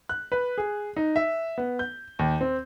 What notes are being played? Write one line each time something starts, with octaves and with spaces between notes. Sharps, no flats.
F#6
B4
G#4
D#4
E5
B3
G6
D#2
C4